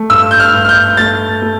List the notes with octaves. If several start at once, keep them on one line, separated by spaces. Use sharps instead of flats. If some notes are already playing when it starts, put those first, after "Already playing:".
Already playing: A3
G2 E6
G6
F6
G2
F6
G6
A3 A6
A3